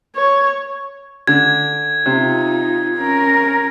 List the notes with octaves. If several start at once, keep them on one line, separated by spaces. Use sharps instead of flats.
C#5
D3 G#6
C3 D#4 F4
C#4 A#4